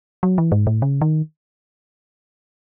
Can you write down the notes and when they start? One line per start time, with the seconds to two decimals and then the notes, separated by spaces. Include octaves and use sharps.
0.23 F#3
0.38 E3
0.52 G#2
0.67 A2
0.82 C#3
1.01 D#3